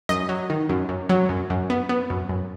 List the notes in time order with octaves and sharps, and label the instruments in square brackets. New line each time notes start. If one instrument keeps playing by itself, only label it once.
[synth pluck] F#2 D#5
F#3
D#3
F#2
F#2
F#3
F#2
F#2
B3
B3
F#2
F#2